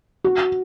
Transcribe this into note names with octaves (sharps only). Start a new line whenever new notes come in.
F#4